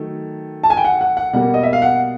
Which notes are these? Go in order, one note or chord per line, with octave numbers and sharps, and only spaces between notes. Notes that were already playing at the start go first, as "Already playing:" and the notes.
Already playing: D#3 F#3 A3
A5
G#5
G5
F#5
F#5
F#5
B2 G3 A#3 F#5
D#5
E5
F5
F#5